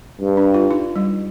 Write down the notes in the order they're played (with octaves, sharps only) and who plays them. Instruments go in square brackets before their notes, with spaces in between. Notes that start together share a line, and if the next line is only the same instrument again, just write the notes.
[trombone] G2
[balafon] D4
F4
D#4
G3